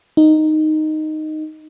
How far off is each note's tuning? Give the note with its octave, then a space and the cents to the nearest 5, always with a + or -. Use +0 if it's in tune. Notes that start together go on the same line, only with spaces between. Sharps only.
D#4 -5